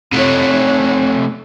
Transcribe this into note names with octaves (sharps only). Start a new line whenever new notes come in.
C3 A3 C#5 F#5